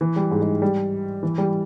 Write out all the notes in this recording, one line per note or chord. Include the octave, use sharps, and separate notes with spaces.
E3
G3
G#2 G#3
G#2 G#3
G3
E3
G3